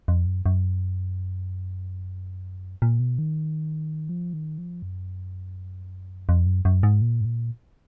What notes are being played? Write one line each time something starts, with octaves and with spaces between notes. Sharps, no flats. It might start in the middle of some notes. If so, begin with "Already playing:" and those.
F2
F#2
F#2
A#2
B2
D#3
F3
D#3
F3
F#2
F2
F#2
F#2
G#2
A#2
G#2
A#2